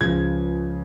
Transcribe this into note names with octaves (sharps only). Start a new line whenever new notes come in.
C#2 C#3 F3 G#6